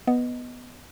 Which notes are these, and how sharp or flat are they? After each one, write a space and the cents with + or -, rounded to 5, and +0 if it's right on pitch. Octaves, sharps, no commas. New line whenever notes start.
B3 +0 D#5 +0